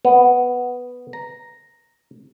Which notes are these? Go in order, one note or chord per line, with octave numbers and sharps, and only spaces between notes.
B3
A#5